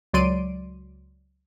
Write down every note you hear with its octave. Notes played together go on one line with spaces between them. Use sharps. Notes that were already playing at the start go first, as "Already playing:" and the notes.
C#2 F#3 D5 C6 D7 D#7